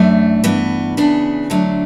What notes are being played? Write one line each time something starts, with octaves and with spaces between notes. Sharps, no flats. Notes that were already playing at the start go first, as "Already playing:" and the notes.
Already playing: F#2 E3 A3 D4
G2 E3 B3
C#3 E3 B3 D4
D3 F#3 A3 D4